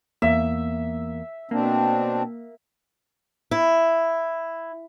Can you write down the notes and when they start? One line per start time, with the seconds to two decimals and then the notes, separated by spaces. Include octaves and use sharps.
0.22 E2 A#3 E5
1.51 B2 A#3 C4 D4
3.51 E4